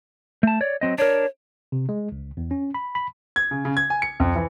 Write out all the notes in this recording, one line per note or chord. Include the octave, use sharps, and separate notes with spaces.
A3 A5
C#5 D5
F#3 C4 D#5
D4 A#4 C#5
C3
G#3
C#2
E2
C#4
B5
B5
G#6
C#3
C#3
G#6
G#5
C#7
F2
E3